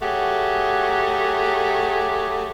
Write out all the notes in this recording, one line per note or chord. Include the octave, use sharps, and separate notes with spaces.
F#3 A3 G4 G#4 F#5